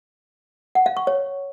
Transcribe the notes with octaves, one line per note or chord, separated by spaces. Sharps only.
F#5
F5
C#6
C#5